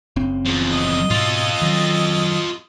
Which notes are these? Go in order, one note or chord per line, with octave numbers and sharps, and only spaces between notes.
F#1 C#3 C4
E2 F3
D#5
G#2 B2 F4 A4
D#3 F#3